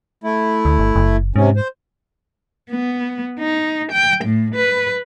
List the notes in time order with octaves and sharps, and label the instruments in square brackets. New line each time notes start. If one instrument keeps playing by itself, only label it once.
[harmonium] A3 E4
[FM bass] D2
G1
F#1
[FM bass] G#2 [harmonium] C3 C#4
[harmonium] C5
[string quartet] B3
D#4
G5
A2
B4